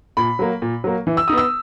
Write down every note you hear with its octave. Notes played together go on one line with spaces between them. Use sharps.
A#2 B5
F#3 A#3
A#2
F#3 A#3
E3
E6
B3 D#4 D#6
E6